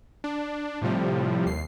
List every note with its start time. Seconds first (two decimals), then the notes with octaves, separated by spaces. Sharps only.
0.24 D4
0.82 A2 C3 F3 G3
1.46 D#2 C7